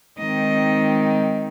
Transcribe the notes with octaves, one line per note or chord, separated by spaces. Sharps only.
D#3 G#3 C4 D#4 D#5